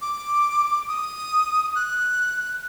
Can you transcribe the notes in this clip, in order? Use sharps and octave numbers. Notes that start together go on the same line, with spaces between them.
D6
D#6
F#6